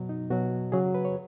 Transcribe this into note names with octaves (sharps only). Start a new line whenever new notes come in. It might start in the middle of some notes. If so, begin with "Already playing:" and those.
Already playing: B2 F#3
D#4
B2 F#3 F#4
C#3 F#3 G#4
B4
C#5